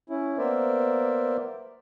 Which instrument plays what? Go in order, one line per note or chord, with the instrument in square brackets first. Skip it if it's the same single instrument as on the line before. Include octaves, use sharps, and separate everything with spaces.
[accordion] C#4 E4
A#3 B3 A#4 C5 D5 E5